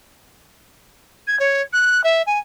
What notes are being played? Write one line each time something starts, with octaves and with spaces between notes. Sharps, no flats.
G#6
C#5
F#6
E5
G#5